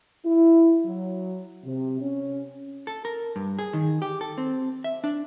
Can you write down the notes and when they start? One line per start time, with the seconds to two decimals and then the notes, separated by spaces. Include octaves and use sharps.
0.25 E4
0.85 F#3
1.64 C3
2.02 C#4
2.87 A4
3.05 A#4
3.36 G2
3.59 G#4
3.73 D#3
4.02 G4
4.21 A4
4.38 C4
4.84 E5
5.04 D4